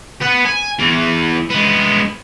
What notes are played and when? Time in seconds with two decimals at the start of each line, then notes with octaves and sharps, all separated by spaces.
0.21 B4 F#5
0.45 G#5
0.79 E2 E3
1.50 G#3 B3